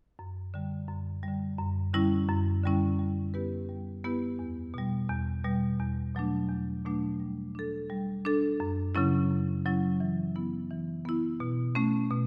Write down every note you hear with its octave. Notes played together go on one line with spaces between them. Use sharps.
F#2
D3 G3
F#2
D3 G3
F#2
D3 G3 C#4 E4
F#2
D3 G3 C#4 E4
G3
B3 E4 G4 B4
G3
B3 E4 G4 B4
E2
B2 G3
E2
B2 G3
E2
B2 F#3 A3 D4
E2
B2 F#3 A3 D4
G3
D4 A4
G3
D4 A4
F#2
C#3 F#3 C#4 E4
F#2
C#3 F#3 C#4 E4
E3
B3 E4
E3
B3 E4
B2
A3 C#4
B2